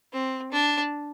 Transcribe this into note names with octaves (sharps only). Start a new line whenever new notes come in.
C4
D4